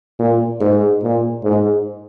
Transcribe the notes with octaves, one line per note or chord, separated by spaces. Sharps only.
A#2
G#2
A#2
G#2